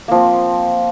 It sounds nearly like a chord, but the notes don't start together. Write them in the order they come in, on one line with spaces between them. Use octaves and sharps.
A#3 F3 C4